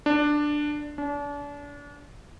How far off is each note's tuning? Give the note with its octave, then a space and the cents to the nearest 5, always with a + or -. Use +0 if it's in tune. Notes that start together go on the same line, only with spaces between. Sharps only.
D4 +10
D4 -35